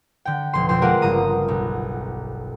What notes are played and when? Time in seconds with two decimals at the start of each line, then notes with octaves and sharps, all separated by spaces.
0.25 D3 G5
0.53 F1 B2 C6
0.69 F2 B2 G5 C6
0.82 G#3 F4 A#4 D5 F#5
1.01 G1 C#3 A#5 D#6 A#6
1.48 B1